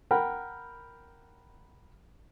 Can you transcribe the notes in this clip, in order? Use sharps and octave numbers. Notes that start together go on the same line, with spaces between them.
A#4 F#5 G5 B5